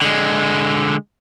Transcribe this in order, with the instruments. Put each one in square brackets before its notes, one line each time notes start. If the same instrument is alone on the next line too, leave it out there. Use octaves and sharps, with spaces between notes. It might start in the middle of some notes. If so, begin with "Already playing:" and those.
[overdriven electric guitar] D3 G#3